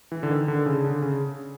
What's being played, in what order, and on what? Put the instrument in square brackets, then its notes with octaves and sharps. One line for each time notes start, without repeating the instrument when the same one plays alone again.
[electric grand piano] E3
D3
D#3
D3
C#3
D3
C#3